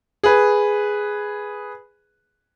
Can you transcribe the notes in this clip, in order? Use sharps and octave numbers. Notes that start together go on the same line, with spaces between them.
G#4 B4